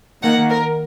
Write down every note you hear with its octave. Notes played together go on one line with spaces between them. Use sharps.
D#3 A#3 F#5
A#4